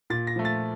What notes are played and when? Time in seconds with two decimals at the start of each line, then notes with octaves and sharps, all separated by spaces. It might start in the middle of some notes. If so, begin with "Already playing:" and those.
0.10 A#2 A6
0.27 A#6
0.36 F3 A3
0.45 A6